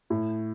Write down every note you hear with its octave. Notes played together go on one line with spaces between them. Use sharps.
A2